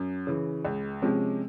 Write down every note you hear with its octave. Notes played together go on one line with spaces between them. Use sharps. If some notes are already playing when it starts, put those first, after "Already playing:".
Already playing: F#2
C#3 E3
C#2
C3 F3 G#3 C#4